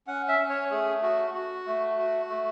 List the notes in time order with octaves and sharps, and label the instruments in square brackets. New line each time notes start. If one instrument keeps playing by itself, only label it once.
[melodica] C#4 F#5
E5
C#4
C#5
A3 G#4
F#4
F#4
A3
F#4
A3